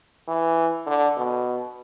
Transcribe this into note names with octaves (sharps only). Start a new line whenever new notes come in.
E3
D3
B2